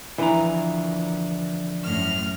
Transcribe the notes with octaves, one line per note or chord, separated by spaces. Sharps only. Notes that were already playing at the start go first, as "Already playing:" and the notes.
D3 E3 F3 A#5
F#2 A2 F6